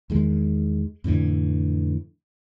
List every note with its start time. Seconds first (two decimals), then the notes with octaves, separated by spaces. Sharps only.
0.10 E2 D#3 G#3
1.04 F2 A2 D3 E3